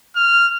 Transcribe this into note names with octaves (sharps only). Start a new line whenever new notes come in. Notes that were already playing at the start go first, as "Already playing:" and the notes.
F6